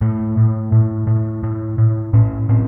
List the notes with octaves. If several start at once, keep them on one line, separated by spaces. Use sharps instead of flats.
A2 A3
A2
A2
A2
A2
A2
A2 C#4
A2 C4